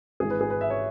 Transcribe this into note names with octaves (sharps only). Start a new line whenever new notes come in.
G#1 G#2 E3 G#4
B4
G#4
B4
E5
C#5